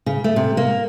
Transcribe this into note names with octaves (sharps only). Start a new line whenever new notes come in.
C#3
A3
C3
A#3